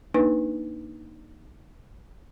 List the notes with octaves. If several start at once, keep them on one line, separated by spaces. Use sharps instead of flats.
A#3 D4 D#4 B4